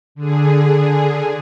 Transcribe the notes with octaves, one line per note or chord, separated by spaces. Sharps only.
D3 G#4